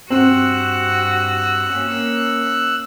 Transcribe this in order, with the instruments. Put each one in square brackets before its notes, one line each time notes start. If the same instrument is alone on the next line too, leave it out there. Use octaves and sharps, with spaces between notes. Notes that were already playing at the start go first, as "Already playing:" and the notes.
[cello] G2 F#4 [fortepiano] C4 [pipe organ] E6 F#6
[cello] A#3 C#4